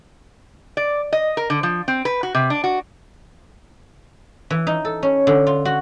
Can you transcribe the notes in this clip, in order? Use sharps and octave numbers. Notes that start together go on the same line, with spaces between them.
D5
D#5
A#4
D3
F3
C4
B4
F#4
C3
D4
F#4
E3
D#4
A4
C#4
D3
F4
F#4